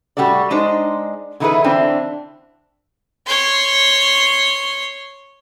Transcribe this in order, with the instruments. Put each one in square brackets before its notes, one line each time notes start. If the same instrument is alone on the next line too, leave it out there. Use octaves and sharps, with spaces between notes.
[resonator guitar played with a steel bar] A2 F#3 G3 F#4 A4 D5
G#3 D4 D#4 C5 D#5
D3 E3 D#4 E4 G#4 B4
D3 E3 C4 D4 E4
[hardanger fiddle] C#5 C6